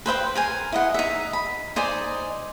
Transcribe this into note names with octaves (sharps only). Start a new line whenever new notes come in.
B4 C5 E5 G5
A#4 C5 G#5
E4 D#5 F#5
D#4 E5
B5
D#4 C5 D5 G#5